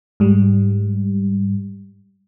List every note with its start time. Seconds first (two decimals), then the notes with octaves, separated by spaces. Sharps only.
0.20 G#2 G3